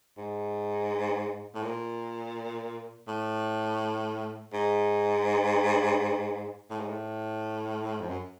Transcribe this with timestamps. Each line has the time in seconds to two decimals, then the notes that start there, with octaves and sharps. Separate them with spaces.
0.18 G#2
1.55 A2
1.62 A#2
3.08 A2
4.53 G#2
6.71 A2
6.80 G#2
6.89 A2
8.01 F2
8.09 F#2